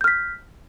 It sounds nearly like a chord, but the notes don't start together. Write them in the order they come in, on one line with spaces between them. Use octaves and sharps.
G6 F6 B6